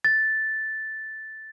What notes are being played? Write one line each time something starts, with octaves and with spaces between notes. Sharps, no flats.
A6